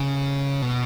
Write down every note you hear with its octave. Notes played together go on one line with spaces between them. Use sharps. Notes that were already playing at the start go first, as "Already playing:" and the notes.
Already playing: C#3
B2